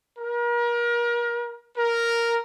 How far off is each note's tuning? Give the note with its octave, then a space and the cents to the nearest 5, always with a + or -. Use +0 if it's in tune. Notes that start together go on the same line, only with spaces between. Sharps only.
A#4 +35
A#4 +0